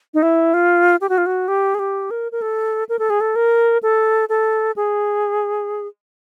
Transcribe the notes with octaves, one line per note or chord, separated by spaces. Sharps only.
D#4
E4
F4
G4
F#4
F4
F#4
G4
G#4
G4
A#4
A#4
A4
A#4
A4
G#4
A4
A#4
A4
A4
G#4